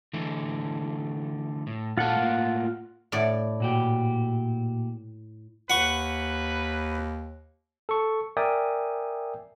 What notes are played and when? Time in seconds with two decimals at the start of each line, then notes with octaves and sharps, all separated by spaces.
0.13 D3 E3 A3
1.67 A2
1.98 A#2 F4 A4 F#5
2.16 A2 A#3
3.12 A2 D5
3.60 A#2 F#4 G4
5.70 D#2 B4 F#5 C#6
7.89 A4 C#6
8.37 A#4 D5 E5 G5 G#5 D#6